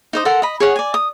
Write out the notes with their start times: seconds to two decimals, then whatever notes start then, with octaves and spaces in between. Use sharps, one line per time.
0.13 D#4 C5 D#6
0.25 A4 A#4 F#5 C6
0.42 D#5 B5
0.60 G#4 C#5 F#5
0.76 D5 G#5
0.94 D#6